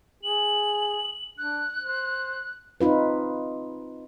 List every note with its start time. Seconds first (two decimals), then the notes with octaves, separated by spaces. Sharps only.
0.23 G#4 F#7
1.38 D4 F#6
1.79 C5
2.81 C4 D#4 F4 B4